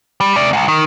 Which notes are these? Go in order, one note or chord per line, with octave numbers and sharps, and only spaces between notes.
G3
C3 D5
C2 G#2
D#3